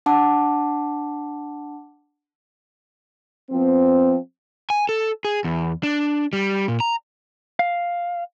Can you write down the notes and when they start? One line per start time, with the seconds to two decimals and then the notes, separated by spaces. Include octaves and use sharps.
0.06 D4 F#5 A5 D6
3.51 F3 B3 C4
4.70 G#5
4.89 A4
5.25 G#4
5.44 E2
5.83 D4
6.33 G3
6.68 A#2
6.80 A#5
7.59 F5